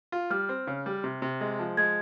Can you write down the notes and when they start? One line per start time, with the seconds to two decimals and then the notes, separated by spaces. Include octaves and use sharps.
0.12 F4
0.30 G3 F6
0.49 C4
0.67 C#3
0.86 G3
1.04 C3
1.22 C3
1.41 G#3
1.59 F3
1.77 G#3 G#6